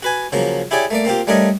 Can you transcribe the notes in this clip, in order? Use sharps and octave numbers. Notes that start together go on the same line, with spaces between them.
F#4 B4 G#5
C#3 F3 F#3 A#3
E4 G4 G#4 C#5 D5
A3 A#3 D5
A#3 C4 F4 G4
G3 A3 D4 A#4 C#5 D#5